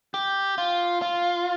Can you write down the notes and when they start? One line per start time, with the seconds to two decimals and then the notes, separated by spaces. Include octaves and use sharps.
0.14 G4
0.58 F4
1.02 F4